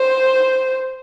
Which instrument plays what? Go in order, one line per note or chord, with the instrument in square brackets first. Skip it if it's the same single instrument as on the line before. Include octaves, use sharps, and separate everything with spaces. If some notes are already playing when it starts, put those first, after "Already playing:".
Already playing: [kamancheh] C5